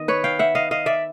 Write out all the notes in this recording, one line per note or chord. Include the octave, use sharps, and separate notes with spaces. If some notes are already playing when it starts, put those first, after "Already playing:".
Already playing: D#3 B3 D#5
B4 C#5
F5 G5
E5 F#5
D#5 F5
D#5 F5
D5 E5